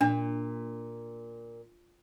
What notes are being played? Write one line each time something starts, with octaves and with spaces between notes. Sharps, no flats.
A#2 D4